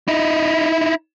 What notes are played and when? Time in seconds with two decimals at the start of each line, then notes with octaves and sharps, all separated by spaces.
0.08 D#4 E4